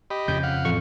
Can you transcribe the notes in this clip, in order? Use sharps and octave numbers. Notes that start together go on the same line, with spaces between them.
G4 D#5 B5
F2 C#3 G6
F5 F#5
A1 F2 C#6